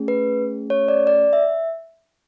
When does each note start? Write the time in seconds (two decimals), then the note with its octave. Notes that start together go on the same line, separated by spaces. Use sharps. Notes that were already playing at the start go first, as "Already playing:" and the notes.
Already playing: A3 C#4 G#4
0.08 B4
0.70 C#5
0.88 D5
1.07 D5
1.33 E5